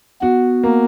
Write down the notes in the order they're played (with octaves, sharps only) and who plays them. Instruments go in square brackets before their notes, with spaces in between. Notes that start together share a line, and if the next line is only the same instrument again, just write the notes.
[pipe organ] B3 [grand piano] F#4
[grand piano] A#3